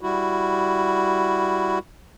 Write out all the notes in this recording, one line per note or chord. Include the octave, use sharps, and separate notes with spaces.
G3 E4 F#4